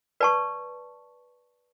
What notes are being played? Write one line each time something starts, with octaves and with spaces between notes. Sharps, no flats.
B4 D5 A5 C#6